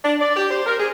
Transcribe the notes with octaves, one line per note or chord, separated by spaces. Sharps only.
D4
D5
G4
C5
A#4
G#4